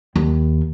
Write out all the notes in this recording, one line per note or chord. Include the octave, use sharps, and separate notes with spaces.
D#2